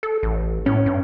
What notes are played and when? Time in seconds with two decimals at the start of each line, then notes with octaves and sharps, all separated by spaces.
0.03 A4
0.23 A1
0.66 A2 C#4
0.86 G2